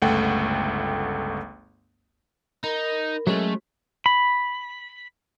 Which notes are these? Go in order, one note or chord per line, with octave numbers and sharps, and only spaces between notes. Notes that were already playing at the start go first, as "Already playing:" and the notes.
G1 C#2 A3 F#5 G5
D#4 A#4 B5
F#3 G#3 A3 C#4
B5